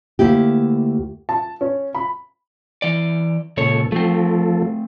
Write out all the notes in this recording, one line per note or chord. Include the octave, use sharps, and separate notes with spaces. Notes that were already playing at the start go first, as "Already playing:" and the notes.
D2 A#3 E4 G4
A5
C#4
B5
E3 D5
C#2 A#2 C#3 A4 C#5
F3 A3 C4 A4